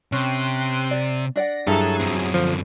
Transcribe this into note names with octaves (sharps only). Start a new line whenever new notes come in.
C3 C#4 G5 C6 F#6
D5
D4 D5 F#5 A#6
G2 F#3 E4 G#4 A4 A#5
F#2 C4
D3 F3